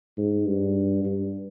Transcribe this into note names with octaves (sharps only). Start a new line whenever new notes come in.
G#2
G2
G2